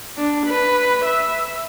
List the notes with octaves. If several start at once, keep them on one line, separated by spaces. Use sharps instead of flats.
D4
B4
E5